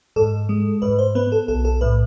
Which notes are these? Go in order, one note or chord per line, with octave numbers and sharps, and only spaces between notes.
G#2 A4
G#3
G#2 B4
C5
B3 B4
A4
B1 A4
A4
A2 B4